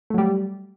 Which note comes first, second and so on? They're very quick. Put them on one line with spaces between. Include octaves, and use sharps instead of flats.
A3 F#3 G3